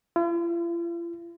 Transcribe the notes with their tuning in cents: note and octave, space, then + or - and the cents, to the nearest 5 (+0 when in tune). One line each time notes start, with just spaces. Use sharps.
F4 -45